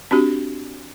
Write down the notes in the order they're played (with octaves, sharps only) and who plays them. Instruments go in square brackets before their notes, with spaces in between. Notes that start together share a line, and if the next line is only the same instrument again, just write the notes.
[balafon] C4 D4 F#4 G4